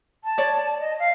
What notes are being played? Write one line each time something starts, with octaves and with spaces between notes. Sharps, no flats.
A5
C#5 D5
D#5
F5